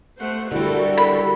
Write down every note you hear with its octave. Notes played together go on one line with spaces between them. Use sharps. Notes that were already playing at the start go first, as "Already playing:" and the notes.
A3 C5 F#5
D3 G3 E4 F#4 A4 A#4
B5